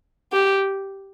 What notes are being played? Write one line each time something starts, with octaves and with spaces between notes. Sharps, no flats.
G4